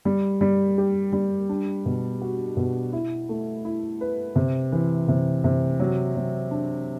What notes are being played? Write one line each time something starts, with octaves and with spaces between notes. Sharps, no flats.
G3
G3
G4
G3
D4
B2
F#4
B2
E4
A3
E4
B4
C3
E3
C3
C3
F#3
F#3
D4